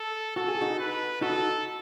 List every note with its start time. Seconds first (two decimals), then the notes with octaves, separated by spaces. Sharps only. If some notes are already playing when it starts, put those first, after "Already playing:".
Already playing: A4
0.36 F#4 A4
0.48 G#4
0.61 D#4 F#4
0.79 B4
1.21 D#4 F#4 A4